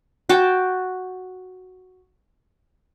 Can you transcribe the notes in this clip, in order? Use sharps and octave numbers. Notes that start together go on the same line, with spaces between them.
F#4 G5 A5 D6